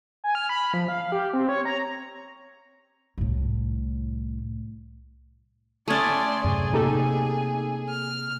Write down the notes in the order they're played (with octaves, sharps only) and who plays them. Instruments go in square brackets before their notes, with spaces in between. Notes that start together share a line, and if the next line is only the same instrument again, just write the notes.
[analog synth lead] G#5
F6
B5
F3
F5
G4
C4
C#5
A#5
[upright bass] C2 A2
[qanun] A3 C#4 [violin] D5 C6 [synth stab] D#6 G#6 A6
[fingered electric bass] F#2 A2 C3 [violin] G#4
[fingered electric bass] C3 A#3 [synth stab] D#4 G4 A4
[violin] F6